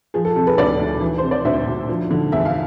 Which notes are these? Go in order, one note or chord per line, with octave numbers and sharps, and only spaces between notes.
F3 G#4
A4
C3 A4
G#4 B4
D2 B4 D5
D2
E3
C3 C5
D5
D2 C5 E5
D2
F3
D3
E2 E5
F5